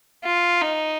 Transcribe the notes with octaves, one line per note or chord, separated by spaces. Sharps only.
F4
D#4